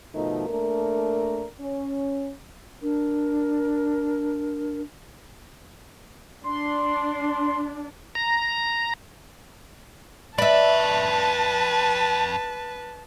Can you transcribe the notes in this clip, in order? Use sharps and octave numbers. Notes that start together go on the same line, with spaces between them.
B2 D#3 F3 A3 D#4 A#4
A3 A#3 D4 A#4
C#4
D4 A#4
D4 C6
A#5
F2 B4 D5 E5 A5 B5